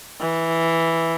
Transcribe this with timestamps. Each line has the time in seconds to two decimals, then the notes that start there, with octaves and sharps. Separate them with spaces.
0.21 E3